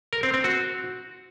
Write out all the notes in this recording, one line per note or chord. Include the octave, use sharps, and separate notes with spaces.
A#4
C4
C4
F#4